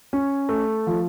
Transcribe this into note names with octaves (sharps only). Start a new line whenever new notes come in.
C#4
A3
F3